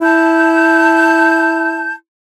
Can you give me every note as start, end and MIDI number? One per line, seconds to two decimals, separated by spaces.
0.01 1.95 64
0.01 1.94 81
0.01 1.94 91